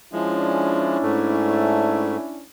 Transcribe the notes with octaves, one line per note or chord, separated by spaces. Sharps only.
F3 G#3 C#4 D4 E4
G#2 A3